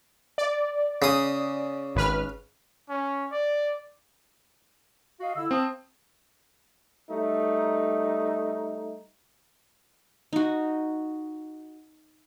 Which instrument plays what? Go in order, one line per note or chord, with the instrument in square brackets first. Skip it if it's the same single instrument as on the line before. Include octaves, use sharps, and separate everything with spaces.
[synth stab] D5
[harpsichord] C#3 D#6
[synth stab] G#1 B4 F6
[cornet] C#4
D5
[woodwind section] F#4 D#5 F5
D3 E4 E6
[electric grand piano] C4 [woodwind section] F5 A5 D#6
[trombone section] G3 A3 D#4
[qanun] D#4 F#4